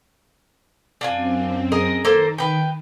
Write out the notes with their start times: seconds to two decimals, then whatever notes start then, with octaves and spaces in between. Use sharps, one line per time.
1.01 F#2 C4 D4 F4 G#5
1.72 G#4 A#4 D#5
2.05 D#3 A#3 A4 C5
2.38 B4 G5